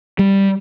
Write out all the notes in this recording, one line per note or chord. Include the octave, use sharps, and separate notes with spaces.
G3